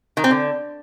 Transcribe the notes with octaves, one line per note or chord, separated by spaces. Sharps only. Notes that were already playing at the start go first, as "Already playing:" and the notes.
D#3
C4
D3